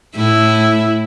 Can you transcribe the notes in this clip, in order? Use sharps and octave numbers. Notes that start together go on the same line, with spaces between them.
A2 E4